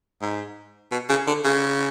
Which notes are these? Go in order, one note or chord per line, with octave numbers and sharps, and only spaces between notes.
G#2
B2
C#3
D3
C#3